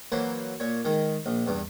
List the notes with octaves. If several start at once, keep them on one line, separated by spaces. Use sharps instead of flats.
E3 F#3 A#3 B4 C5
A#2 C#5
D#3 G#3
A#1
E2 G2